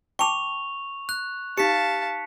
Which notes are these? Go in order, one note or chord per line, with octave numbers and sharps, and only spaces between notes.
G5 A5 C#6 D6 F7
F#6
D#4 G4 F5 A5 B6 C#7